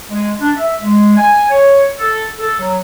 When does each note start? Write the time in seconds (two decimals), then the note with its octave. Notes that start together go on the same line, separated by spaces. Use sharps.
0.10 G#3
0.39 D4
0.55 E5
0.81 G#3
1.16 G#5
1.49 C#5
1.97 A4
2.38 A4
2.57 F#3